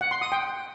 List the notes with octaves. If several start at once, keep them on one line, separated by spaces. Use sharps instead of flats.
F#5
C6
D#6
G5